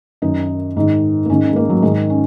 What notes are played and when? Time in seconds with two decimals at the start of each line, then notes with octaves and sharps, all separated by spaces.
0.22 F#2 D#3 D#4
0.77 G#2 D#3
1.26 A#3
1.30 G#2 D#3 C#4
1.43 C#4
1.52 G#3
1.56 A#3
1.70 F#3
1.82 G#2 D#3 G#3
2.10 C#4